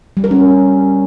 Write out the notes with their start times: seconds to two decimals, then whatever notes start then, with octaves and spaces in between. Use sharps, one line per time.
0.17 G3
0.24 A#4
0.31 C#4